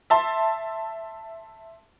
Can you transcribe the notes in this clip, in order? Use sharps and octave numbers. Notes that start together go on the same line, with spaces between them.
E5 A5 C6